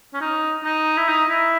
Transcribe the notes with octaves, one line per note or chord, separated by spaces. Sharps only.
C#4
D#4
D#4
E4
D#4
E4